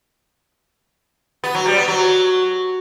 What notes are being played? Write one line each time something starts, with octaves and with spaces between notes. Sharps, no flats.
B3
F#3
G3
B3
F#3